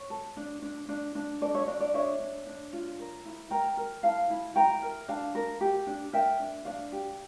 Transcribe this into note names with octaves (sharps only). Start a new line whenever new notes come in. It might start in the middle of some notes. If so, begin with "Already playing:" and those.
Already playing: C#5
A4
D4
D4
D4
D4
A4 D5
C#5 E5
D4 D5
D5
D4 C#5 E5
D4
D4
F4
A#4
E4
A#4 G5 A#5
A#4
E4 F5 A5
E4
E4 G5 A#5
A#4
D4 F5 A5
A#4
G4
D4
A#4 E5 G5
D4
D4 D5 F5
G4